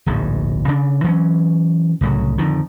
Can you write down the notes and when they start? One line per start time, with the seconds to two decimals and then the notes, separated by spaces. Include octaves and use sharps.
0.06 D1 A#1 G#2
0.68 C#3 D4
1.04 E3 F#3 G#3 C#4
2.01 C2 A2 C#3 F#3
2.38 F2 D3 D#3 F3